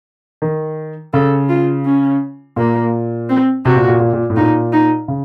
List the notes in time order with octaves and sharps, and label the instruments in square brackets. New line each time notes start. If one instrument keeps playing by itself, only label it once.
[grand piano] D#3
[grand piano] C#3 [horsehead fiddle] A4
[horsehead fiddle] F4
C#4
[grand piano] A#2 [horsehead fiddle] A#3
[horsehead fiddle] C4
[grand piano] C3 [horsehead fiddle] F#4
[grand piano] A#2
A#2
A#2
A#2
A2
[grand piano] A#2 [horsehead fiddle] D#4
[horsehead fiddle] D#4
[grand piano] C#3